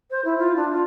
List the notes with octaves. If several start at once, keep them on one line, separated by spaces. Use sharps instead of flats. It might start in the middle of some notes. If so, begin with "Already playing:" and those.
C5
E4
F4
D4
F4